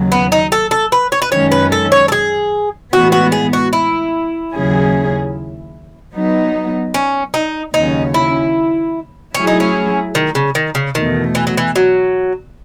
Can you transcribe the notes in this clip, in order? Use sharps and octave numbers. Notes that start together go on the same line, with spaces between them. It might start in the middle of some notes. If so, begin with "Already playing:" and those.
Already playing: D#2 C#3 F#3
B3
D#4
A4
A4
B4
C#5
B4
F#2 D#3 G#3 C#4 C#5
B4
A4
C#5
A4
G#4
A2 E3 G#3 B3 F#4
F#4
G#4
F#4
E4
D#2 C#3 F#3 C#4 G#4
F#3 B3 D#4
C#4
D#4
D#2 C#3 F#3 C#4 D#4
E4
F#3 A3 C#4 E4 G#4
D#4
C#4
D#3
C#3
D#3
C#3
E2 B2 D#3 A3
E3
F#3
E3
F#3